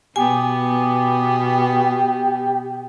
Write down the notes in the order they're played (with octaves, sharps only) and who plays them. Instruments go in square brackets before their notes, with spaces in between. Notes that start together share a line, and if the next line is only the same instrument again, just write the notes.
[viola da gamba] B2 B3 [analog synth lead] G4 [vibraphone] G#5